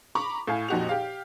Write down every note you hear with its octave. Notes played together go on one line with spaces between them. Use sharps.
A#5 B5 C#6 D6
A2 F5 G#5
F2 A#2 D#4 F#4 G4 F7
G4 F5